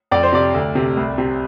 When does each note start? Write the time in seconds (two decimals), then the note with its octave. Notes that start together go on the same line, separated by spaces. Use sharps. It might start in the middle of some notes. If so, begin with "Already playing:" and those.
0.11 F2 D5
0.23 C5
0.33 C3 D5
0.54 D2
0.75 C3
0.97 C2
1.18 C3